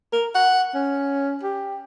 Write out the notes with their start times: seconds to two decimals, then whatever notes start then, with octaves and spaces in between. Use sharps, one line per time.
0.13 A#4
0.35 F#5
0.75 C#4
1.43 G4